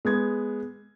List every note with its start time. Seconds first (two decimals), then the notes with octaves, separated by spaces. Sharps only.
0.05 G#3 B3 G#6